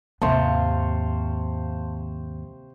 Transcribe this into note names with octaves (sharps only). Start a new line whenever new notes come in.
D#2 G#2 C3 C5 F5 A5 C6 C#6